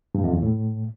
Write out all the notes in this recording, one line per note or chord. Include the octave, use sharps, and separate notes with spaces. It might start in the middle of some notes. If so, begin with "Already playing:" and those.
G2
F2
E2
A2